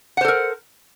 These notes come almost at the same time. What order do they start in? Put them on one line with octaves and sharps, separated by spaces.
F#5 C5 A4 A#4